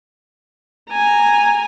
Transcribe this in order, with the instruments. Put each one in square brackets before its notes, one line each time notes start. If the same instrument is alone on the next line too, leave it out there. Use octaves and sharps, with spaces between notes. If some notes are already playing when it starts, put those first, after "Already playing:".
[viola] G#5 A#5